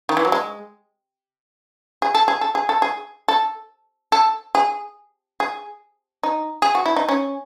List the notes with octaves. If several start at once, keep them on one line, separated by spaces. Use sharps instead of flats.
D#3
E3
F#3
G#3
G#4
A4
G#4
A4
G#4
A4
G#4
A4
A4
G#4
G#4
D#4
G#4
F#4
E4
D#4
C#4